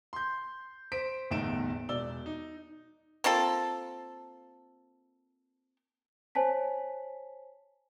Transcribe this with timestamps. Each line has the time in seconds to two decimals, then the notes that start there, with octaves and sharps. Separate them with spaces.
0.13 C6 G6
0.92 C5 B6 D7
1.31 G1 E2 A2 D#4 D7 E7
1.89 E1 D5 E6 G7
2.26 D#4
3.24 A#3 C4 F4 A4
6.35 C5 C#5 G#5 A5 B6